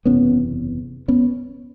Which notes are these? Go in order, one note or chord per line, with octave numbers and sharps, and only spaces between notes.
F#1 E2 C3 B3 C#4
B3 C#4